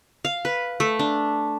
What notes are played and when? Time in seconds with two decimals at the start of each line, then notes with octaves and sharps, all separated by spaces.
0.25 F5
0.45 B4
0.80 A3
0.99 D4